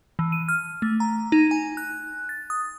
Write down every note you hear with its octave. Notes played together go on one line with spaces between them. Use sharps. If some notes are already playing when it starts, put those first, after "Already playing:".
E3
D#7
F6
A3
A#5
D#4
G#5
F#6
A6
D#6